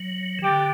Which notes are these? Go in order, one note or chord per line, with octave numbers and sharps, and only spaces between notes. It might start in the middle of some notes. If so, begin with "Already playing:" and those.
Already playing: F#3
E3
D3 G4